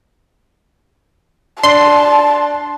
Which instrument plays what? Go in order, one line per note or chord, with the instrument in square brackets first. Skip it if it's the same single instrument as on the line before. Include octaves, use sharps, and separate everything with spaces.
[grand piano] D4 [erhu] A5 [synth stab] C6